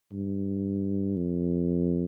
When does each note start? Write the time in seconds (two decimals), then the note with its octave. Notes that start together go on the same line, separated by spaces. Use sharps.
0.12 G2
1.16 F2